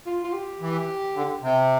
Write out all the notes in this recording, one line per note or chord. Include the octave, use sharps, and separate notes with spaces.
F4
F4
G4
E3
D3
C3